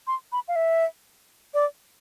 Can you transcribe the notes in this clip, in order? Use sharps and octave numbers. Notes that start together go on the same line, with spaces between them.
C6
B5
F5
E5
D5